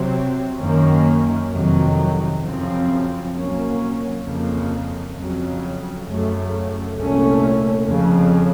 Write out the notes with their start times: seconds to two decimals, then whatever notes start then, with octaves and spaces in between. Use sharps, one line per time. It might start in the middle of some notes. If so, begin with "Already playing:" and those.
Already playing: C3 F#3 C4
0.59 F#2 D#3 A#3 C#4
1.51 F2 C3 D#3 F#3
2.42 F#2 C#3 F3 C4
3.33 C2 A#2 F#3 A#3 C#4
4.24 F2 C#3 F3 A#3
5.15 F2 C#3 F#3
6.06 F#2 C#3 A3
6.97 C2 A#2 A3 C#4
7.88 F2 C#3 F3